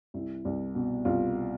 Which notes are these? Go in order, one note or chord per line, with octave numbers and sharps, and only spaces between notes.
C2 E4
C2
B2
C2 F4